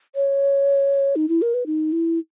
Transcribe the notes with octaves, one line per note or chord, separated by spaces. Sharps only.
C#5
D#4
E4
A#4
B4
D#4
E4